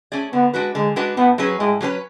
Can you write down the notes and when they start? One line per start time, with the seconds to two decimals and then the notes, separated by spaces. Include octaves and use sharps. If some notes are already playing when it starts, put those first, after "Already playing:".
0.12 A3 C#4 G#4 D5
0.33 D3 B3
0.53 G#3 D4 F#4 B4
0.75 D3 G#3
0.96 G#3 D4 F#4 B4
1.17 A2 B3
1.38 F#3 C#4 G#4 B4
1.59 A2 G#3
1.81 F#3 C#4 G#4 B4